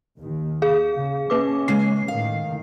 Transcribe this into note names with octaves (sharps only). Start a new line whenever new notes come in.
D#2 D#3
G#4 F5
C#3
A#3 C#4 B4 D6
C#3 G#3 C7
A2 D#3 F5